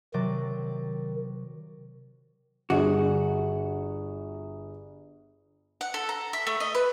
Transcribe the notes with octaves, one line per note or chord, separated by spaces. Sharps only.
C3 D#3 F#3 D5
G1 F#4 G#4
F#5
A4
A#5
E5
A3
D#5
B4